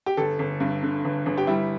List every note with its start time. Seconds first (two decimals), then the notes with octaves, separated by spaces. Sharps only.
0.06 G4
0.17 G1 A4
0.39 G1
0.60 G2
0.83 D3
1.05 G1
1.26 G1
1.38 G4
1.47 G3 E4